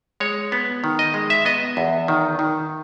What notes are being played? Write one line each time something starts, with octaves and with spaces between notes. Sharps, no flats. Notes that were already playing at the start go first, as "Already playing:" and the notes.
G#3 C#5
B3
D#3
D#5
G#3
E5
B3 D#5
E2
D#3
D#3